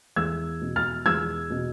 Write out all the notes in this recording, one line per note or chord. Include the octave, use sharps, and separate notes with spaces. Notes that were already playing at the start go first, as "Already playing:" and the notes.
E2 E6 G#6
B2
F6 A6
E2 E6 G#6
B2